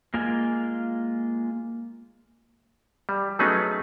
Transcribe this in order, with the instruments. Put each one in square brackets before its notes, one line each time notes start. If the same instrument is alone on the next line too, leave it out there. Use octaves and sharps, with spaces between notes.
[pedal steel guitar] G#3 A#3 F4 G#5
[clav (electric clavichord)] G3
F#3 A3 B3 C#4 D#4 G#4